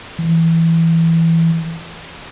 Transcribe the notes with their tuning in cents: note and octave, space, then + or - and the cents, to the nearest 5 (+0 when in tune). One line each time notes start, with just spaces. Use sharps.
E3 +0